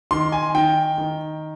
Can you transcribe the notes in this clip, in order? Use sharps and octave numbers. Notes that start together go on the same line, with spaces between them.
D#3 C6
G#5
D#3 G5
D#3